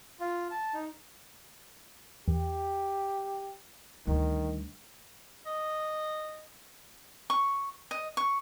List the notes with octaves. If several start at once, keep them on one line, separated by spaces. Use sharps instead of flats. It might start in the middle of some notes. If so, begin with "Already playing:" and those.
F4
A5
D#4
E2 G4
D2 D#3 G3
D#5
C#6
D#5
C#6